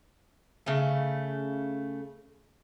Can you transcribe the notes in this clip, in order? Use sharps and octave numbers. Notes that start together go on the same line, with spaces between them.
C#3 A3